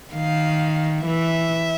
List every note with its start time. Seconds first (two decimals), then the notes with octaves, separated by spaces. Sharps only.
0.14 D#3 F5
1.06 E3 E5